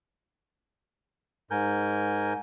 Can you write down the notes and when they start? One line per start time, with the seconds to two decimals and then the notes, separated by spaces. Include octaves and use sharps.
1.51 G#2 A#4 G#5 G6